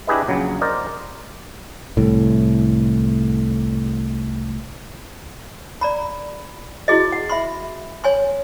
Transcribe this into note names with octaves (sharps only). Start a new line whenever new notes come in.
D4 E4 G4 G#4 B4 D#5
A#1 C#3 F#3
A#4 C5 D5 D#5
C2 A2
D5 A#5 B5
E4 F#4 G#4 D#5
F#5
E5 B5 C6
C#5 G#5 C6